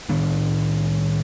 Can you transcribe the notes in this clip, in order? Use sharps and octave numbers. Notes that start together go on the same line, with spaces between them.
A2 D#3 B3 D4